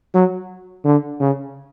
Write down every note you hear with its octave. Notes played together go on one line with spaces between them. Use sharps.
F#3
D3
C#3